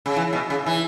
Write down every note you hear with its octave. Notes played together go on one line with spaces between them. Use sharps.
C#3
E3
B2
C#3
E3